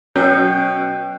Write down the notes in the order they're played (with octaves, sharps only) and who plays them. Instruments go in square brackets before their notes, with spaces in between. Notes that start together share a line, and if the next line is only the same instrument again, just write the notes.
[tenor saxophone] B2 [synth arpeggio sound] F#3 C#4 [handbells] G5 G6